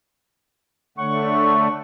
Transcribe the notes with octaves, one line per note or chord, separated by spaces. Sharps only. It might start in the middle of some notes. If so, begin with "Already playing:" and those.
D3 A3 C#5 F#5 C#6